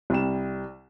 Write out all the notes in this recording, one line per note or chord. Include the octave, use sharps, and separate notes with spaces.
C2 G3 E7